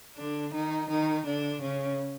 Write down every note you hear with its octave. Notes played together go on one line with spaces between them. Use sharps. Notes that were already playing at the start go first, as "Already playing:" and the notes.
D3 D4
D#3 D#4
D#3 D#4
D3 D4
C#3 C#4